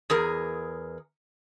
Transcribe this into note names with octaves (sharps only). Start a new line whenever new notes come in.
E2 G#4 A#4